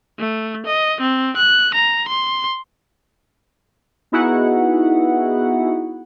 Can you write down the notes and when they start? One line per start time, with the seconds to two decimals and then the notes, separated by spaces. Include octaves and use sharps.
0.19 A3
0.66 D#5
1.01 C4
1.37 F#6
1.75 A#5
2.08 C6
4.12 B3 D#4 E4 F#4 G#4 F#5